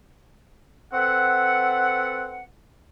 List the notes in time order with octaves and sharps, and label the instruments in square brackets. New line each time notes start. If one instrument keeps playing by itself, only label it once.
[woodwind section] C4 A4 B4 F#5